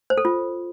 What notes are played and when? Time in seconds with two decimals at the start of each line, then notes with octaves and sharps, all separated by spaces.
0.10 C5
0.18 A4
0.25 F4